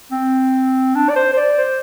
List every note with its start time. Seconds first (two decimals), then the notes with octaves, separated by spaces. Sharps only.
0.12 C4
0.95 D4
1.09 D5
1.16 C5
1.33 C5
1.37 D5
1.58 C5